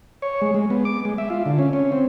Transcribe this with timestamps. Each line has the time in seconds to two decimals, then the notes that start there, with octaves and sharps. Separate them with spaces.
0.22 C#5
0.42 G#3
0.54 G#3
0.70 B3
0.85 D6
1.05 G#3
1.18 E5
1.30 F4
1.46 D3
1.59 C#4
1.73 C#4
1.92 C4